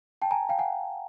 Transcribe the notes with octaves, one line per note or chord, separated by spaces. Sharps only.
G5 A5
G#5 A#5
F5 G5
F#5 G#5